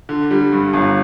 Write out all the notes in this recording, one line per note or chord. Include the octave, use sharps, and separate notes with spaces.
D3
G3
G2
G1